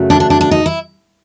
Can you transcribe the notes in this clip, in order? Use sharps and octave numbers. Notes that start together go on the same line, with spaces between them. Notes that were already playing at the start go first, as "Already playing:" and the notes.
Already playing: F#2 C#3 F#3 A3
D4
D4
D4
D4
D#4
E4